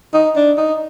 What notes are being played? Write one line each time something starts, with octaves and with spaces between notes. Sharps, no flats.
D#4
D4
D#4